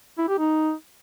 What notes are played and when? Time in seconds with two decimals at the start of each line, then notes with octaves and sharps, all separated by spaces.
0.18 E4
0.29 G4
0.39 D#4